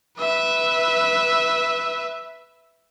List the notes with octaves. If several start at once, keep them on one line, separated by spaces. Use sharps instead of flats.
B4 E5